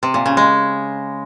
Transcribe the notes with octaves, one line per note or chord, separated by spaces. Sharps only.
C3
A#2
C#3
G#3